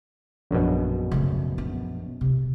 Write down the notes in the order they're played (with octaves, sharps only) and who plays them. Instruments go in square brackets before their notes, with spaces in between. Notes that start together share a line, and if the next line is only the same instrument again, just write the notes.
[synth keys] A#1 F#2 B2
[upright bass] C#3 A3
B3
D#1 C3